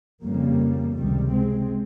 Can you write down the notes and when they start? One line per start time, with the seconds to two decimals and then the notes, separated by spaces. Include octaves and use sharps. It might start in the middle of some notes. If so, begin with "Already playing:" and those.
0.23 F2 C#3 G3 A#3
0.96 C#2 C3 D#3 G3
1.34 G#3 C4